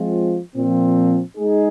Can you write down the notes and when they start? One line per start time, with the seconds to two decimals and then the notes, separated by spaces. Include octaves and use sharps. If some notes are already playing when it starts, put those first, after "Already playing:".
Already playing: F3 G#3 C4 F4
0.55 A#2 F3 C4
1.38 G#3 D#4 G#4